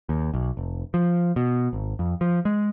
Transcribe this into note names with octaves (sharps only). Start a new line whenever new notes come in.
D#2
B1
F1
F3
B2
G#1
F2
F3
G#3